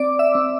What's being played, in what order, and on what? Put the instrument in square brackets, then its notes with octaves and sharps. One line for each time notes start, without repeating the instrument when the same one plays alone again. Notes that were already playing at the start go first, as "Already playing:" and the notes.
Already playing: [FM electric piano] C4 D5 D6
E5 E6
C4